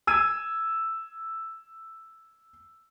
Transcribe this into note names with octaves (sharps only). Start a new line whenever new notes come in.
E6 G#6 D#7